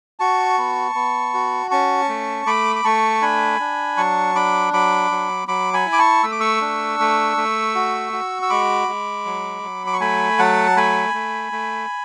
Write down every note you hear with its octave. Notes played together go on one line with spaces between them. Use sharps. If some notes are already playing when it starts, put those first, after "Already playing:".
F#4 A5 C#6
B3
B3
F#4
C#4 A5 C#6
A3
A3 B5 D6
D6
A3 A5 C#6
D4 G#5 B5
D4
F#3 A5 C#6
D4 B5 D6
F#3 B5 D6
F#3
F#3 B5 D6
G#5 B5
E4
D6
A5 C#6
A3 E6
D6
C#6 E6
D4
A3
A3
F#4
F#4
E6
G#3 B5 D6
G#3
F#3
F#3
D6
C#6
A3 G#5 B5
F#3 F#5 A5
A3 G#5 B5
A3
A3